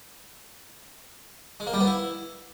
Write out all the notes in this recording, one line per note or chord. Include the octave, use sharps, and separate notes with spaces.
G#3
A#3
G3
B3
E4